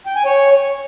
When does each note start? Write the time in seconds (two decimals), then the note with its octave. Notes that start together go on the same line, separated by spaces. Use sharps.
0.06 G5
0.16 G#5
0.25 C#5